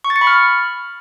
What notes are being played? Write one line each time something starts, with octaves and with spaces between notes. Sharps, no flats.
C#6
A6
C#7
B5
F6